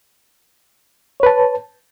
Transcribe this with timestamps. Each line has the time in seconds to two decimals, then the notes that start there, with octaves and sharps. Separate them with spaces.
1.20 C#5
1.23 B4
1.26 A5